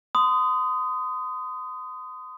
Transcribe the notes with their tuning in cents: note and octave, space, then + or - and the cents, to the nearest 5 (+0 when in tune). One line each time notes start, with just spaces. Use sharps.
C6 -35 D#6 +0